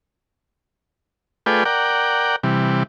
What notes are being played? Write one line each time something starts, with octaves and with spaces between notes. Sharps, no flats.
A3 F4 G#4 B4 D5 G5
A#4 D5 F#5 G5
C3 E3 G3